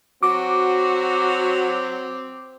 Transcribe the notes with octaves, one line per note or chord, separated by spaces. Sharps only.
F#3 C4 F#4 D6